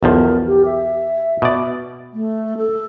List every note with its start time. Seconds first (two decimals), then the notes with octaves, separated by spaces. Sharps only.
0.03 B1 E2 F3 A#4
0.47 G4
0.66 E5
1.42 B2 D5
2.13 A3
2.57 A4